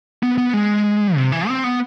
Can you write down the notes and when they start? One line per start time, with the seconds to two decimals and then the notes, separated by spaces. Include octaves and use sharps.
0.23 B3
0.38 B3
0.54 G#3
1.16 C3
1.32 E3
1.48 C4
1.64 B3